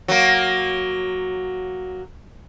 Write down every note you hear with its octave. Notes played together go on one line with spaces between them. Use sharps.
F#3 A#3